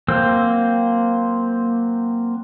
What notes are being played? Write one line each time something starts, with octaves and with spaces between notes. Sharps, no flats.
F#3 A#3 C4 C5 E6